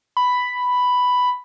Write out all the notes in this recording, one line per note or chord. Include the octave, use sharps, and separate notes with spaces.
B5